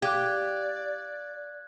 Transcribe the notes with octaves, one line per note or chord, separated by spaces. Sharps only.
G4 D5 F5 D6 F#6 G#6